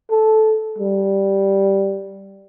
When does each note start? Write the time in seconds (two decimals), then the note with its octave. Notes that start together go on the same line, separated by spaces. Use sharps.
0.11 A4
0.78 G3